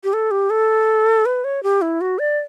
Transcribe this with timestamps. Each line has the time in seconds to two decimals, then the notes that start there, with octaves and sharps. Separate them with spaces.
0.04 G4
0.13 A4
0.31 G4
0.50 A4
1.26 B4
1.44 C#5
1.63 G4
1.82 E4
2.01 F#4
2.19 D5